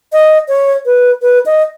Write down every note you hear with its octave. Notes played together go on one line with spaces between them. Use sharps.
D#5
C#5
B4
B4
D#5